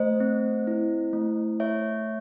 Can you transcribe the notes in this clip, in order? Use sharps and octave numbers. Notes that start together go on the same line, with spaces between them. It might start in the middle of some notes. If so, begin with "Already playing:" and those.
Already playing: A3 C5 D#5
C4
E4
A3
A3 C#5 E5